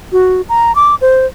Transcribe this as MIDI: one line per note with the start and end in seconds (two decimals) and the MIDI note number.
0.13 0.41 66
0.49 0.75 82
0.75 0.95 86
1.01 1.26 72